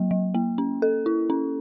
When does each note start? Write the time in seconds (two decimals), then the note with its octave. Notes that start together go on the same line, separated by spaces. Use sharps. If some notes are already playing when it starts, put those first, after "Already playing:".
Already playing: F#3 A#3
0.11 F#3
0.35 A#3
0.58 C#4
0.82 A4
1.06 E4
1.30 C#4